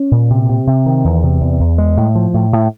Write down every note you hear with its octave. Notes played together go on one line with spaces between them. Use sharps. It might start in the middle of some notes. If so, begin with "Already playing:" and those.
Already playing: C#4
A#2
C3
C3
C3
D#3
E2
C3
E2
E2
G#3
A2
F3
A2
A2